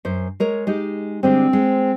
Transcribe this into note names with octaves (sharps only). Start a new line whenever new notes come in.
F#2 C5
G#3 A#4 C#5
G#3 D#4 G4
D3 G3 G#3 C4
G#3